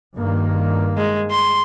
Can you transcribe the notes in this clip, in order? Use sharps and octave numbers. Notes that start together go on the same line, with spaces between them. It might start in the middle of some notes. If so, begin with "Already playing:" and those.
G2 D#3 A#3
G#3
C6